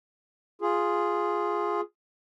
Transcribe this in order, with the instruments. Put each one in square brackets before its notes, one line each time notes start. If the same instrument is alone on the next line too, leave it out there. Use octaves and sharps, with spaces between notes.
[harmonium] F4 G#4